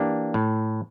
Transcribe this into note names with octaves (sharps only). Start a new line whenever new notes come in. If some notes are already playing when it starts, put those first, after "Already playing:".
Already playing: E3 A#3 D4 G4
A2